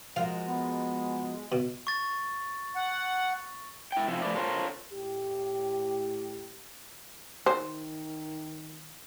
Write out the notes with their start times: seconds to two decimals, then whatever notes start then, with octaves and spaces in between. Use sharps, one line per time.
0.16 F3 G#3 F#4 A#4 F5
0.47 B3
1.52 B2
1.87 C#6 A6
2.76 F#5
3.92 E4 G5
4.08 C3 F3 E5
4.22 F3 A3 B4 D5
4.35 F4 A4 A#4 C5 C#5
4.92 A2 G4
7.46 D#3 C5